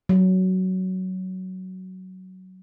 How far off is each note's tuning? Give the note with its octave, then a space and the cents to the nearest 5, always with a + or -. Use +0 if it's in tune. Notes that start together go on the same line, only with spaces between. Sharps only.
F#3 +10